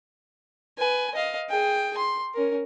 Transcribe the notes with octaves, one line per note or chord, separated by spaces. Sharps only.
B4 G#5
D#5 F5
G#4 G5
C6
C#4 A#4